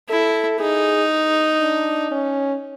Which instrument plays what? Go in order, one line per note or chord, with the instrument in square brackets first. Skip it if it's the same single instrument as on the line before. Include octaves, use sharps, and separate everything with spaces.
[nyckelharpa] E4 [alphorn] A4
[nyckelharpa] D#4 [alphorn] G#4
[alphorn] D4
C#4